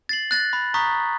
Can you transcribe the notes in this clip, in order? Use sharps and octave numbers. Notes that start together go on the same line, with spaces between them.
A6 C7 F#7
F#6 A6 A#6
B5
A#5 C#6 D#6 G6 B6